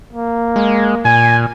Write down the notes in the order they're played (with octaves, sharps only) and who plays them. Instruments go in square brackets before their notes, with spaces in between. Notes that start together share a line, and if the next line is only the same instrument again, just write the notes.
[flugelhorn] A#3
[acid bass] G#3
[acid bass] A#2 [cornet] G#5